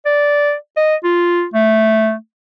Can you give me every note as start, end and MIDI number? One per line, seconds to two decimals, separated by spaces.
0.06 0.54 74
0.77 0.96 75
1.04 1.45 65
1.54 2.15 57